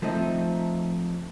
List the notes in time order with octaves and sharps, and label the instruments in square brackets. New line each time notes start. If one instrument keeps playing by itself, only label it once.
[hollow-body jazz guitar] F3 A3 C4 D#4